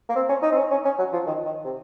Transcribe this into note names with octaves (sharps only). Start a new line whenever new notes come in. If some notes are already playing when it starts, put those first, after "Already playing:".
A#3
C4
C#4
D#4
C4
C#4
C#4
C#4
F#3
F3
D#3
D#3
C3